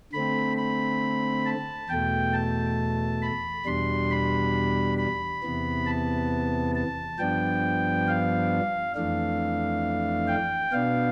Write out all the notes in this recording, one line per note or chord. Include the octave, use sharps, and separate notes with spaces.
D3 A3 C4 B5
B5
A5
E2 B2 A3 G5
A5
B5
E2 B2 G3 D4 C6
B5
B5
E2 C3 E3 B3
A5
A5
G2 F3 B3 D4 G5
F5
F2 E3 A3 D4 F5
G5
B2 B3 D4 F5